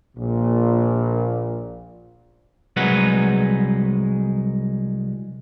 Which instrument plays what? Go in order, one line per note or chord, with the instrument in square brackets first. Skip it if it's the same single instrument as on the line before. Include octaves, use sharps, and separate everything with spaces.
[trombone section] A#1 A#2
[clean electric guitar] C2 F#3 G#3 D#4 B4 F#5